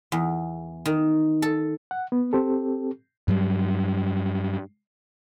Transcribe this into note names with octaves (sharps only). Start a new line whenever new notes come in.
E2
D#3
A4
F#5
B3
C4 G4 A4
G2 F#3 G3